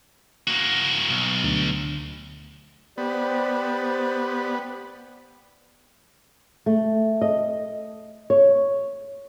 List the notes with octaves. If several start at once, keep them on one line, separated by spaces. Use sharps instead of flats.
A#3 F#4
B1
D2
B3 G4 C5 D5
A3
D#5
C#5